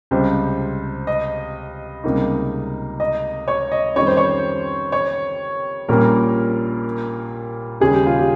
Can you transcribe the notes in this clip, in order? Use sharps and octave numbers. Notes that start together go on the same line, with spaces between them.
C#2 C3 G3 C5
D#5
C#2 C3 G3 A#3 D#4
D#5
C#5
D#5
F2 D#3 G3 C#4 C#5
C5
C#5
C#5
A#1 A#2 G3 A#3 C#4 A#4
D#2 C#3 G3 C#4 G#4
G4
F4
G4